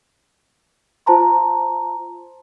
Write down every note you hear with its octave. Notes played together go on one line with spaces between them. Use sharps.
F4 C5 A5 A#5 C6